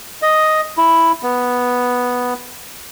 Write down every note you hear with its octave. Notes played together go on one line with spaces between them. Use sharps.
D#5
E4
B3